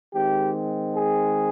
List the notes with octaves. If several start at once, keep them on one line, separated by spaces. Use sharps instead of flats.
D#3 G#3 C4 G4
G#4